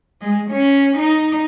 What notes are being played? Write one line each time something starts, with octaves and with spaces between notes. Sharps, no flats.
G#3
C#4
D#4